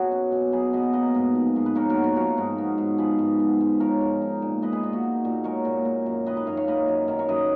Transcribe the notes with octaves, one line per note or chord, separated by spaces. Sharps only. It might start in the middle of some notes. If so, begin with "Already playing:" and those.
Already playing: B2 F#3 F#4 G#4
C#4
B2
F#3 G#4 B4
B2 B4 D#5
A#3 B4 D#5
G#2
F3
G#2
B4
A#3 A#4 C#5
F#4 A#4
G#2
F#4
F3 F#4 A#4
G#2
B3
G#2
F3 G#4 B4
G#2
B3
G#2
F3 A#4 C#5
G#2
D#4
A#2
G#3 B4 D#5
G#4 B4
A#2 F4
F#4
D#4
A#2
G#3 A#4 C#5
A#2
A#3
F#2
D#3 B4 D#5
B4 D#5
F#2 C#5 F5
C#5 F5
A#3 B4 D#5
F#2
D#3 A#4 C#5
A#4 C#5
F#2 B4 D#5